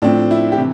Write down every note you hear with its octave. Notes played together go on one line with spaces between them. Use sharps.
A2 F3 C4 D4
E4
G4
C3 E3